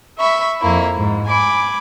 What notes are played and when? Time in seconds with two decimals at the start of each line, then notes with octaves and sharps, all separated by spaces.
0.18 E5 B5 C#6
0.60 F2 A#3 E4
0.96 G#2
1.27 G#5 B5 D6